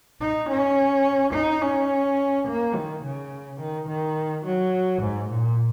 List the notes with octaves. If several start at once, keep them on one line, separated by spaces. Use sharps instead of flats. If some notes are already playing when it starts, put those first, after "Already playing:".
D#4
C#4
D#4
C#4
A#3
D#3
C#3
D#3
D#3
F#3
G#2
A#2